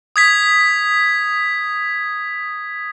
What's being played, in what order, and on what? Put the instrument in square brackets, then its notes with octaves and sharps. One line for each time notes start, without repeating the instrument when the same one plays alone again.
[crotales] D#6 G#6 B6